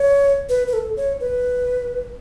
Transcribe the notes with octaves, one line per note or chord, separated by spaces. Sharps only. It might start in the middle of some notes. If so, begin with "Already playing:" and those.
Already playing: C#5
B4
B4
A4
C#5
B4